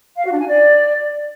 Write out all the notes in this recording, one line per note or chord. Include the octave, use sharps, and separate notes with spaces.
F5
F#4
D4
G#5
D5